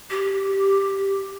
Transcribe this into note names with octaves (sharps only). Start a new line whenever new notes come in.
G4